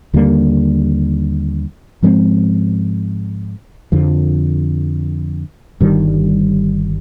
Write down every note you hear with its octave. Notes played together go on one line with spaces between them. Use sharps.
D#2 D3 G3 A#3
G#2 F3 G#3 C4
F2 D3 F3
G1 G2 D#3 G3